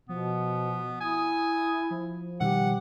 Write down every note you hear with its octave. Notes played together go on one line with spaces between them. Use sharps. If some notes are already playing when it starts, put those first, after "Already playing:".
B2 F3 B3
E4 G#5 D#6
F3
B2 D#3 G3 G4 F#5